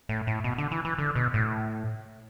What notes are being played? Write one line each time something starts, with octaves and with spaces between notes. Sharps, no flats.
A2
A2
B2
D3
E3
E3
D3
B2
A2